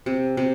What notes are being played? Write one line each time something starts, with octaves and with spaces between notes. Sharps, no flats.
C3
C3